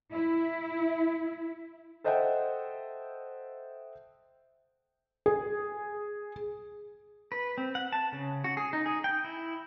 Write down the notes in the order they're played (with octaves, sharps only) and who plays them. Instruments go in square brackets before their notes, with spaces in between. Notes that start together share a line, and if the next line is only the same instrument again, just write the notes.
[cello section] E4
[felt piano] A4 C5 D#5 E5 F#5 G5
G#4
[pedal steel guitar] B4
C4
F#5
A5
C#3
F#4
G#4
D#4
G#4
G5
E4